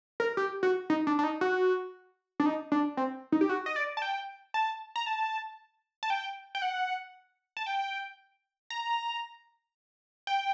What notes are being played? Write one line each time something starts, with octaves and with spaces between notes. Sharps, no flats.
A#4
G4
F#4
D#4
D4
D4
D#4
F#4
D4
D#4
D4
C4
D#4
G4
F#4
D#5
D5
A5
G5
A5
A#5
A5
A5
G5
G5
F#5
A5
G5
A#5
G5